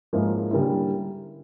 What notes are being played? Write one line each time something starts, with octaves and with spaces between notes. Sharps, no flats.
G#2 F3 A#3 C#4 E4
D3 G3 A#3 C#4 E4